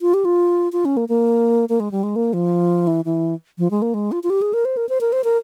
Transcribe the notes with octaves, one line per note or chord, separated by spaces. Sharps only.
F4
G4
F4
F4
C#4
A#3
A#3
A#3
G#3
G3
G#3
A#3
F3
E3
E3
F3
G#3
A#3
G#3
F4
F4
G4
G#4
A#4
C5
A#4
C5
A#4
C5
A#4